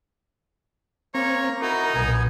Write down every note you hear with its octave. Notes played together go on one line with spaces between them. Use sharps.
A#3 C4 C#5 A#5
D#4 E4 F#4 A#4
B1 A#2 B3 G#5